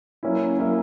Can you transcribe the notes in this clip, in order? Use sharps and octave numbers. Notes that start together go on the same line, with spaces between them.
F#3 A#3 C#4 E4
F#3 A#3 C#4 E4